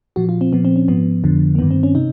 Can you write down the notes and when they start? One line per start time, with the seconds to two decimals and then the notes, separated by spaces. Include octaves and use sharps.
0.16 A#2 F3 F#4
0.29 F4
0.41 C4
0.52 A#2 F3 B3
0.65 C4
0.76 C#4
0.88 G#2 F3 B3
1.24 F2 D3 F3
1.55 A#3
1.59 G2 D#3 B3
1.71 C4
1.83 C#4
1.95 C3 D#4